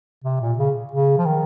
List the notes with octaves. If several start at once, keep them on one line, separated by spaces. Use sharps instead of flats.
C3
A#2
C#3
C#3
F3
D#3